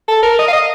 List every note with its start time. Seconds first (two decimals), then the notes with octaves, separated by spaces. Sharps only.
0.08 A4
0.23 A#4
0.39 D#5
0.48 F5
0.53 D#5